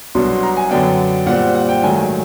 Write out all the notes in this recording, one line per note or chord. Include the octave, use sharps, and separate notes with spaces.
C2 B2 F#3 B3 D4 C6
C6
A#5
G#5
F#2 D3 F#3 B3 D4 G5
A#2 G3 C4 F#5
F#5
G5
G#2 D#3 F#3 A3 G#5
G#5